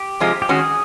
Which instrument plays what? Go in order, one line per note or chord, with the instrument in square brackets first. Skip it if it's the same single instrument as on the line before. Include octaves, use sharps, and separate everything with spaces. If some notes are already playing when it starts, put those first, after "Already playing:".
Already playing: [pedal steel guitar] G4
[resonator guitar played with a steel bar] C3 F3 G#3
[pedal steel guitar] G4
[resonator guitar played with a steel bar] D#3 G#3 C#4 F#4 [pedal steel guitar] G#4